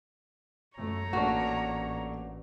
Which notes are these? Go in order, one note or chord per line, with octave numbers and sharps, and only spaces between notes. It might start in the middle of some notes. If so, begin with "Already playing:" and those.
F#2 A3 C#5 A#5
A1 A3 A#3 D4 F#4